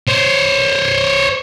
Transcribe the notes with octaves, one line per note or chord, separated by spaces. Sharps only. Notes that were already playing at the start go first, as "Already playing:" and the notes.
C5 C#5